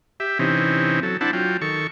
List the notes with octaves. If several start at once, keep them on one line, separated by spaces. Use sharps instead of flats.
G4 E5
C3 E3 C4 C#4 D#4
F#3 A4
C4 D4 E4 F#5 A5
F#3 F4 G5
D#3 A4 C#6